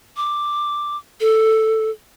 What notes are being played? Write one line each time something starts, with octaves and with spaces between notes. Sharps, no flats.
D6
A4